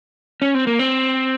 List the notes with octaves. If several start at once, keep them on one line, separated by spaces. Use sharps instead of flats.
C#4
C4
A#3
C4